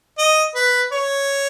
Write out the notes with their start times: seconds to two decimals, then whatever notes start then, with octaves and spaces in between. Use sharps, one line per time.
0.18 D#5
0.55 B4
0.92 C#5